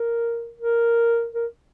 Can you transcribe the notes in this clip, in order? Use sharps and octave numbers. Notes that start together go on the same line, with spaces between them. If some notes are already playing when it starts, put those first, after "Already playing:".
Already playing: A#4
A#4
A#4